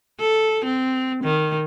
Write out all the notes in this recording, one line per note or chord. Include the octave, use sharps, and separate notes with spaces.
A4
C4
D#3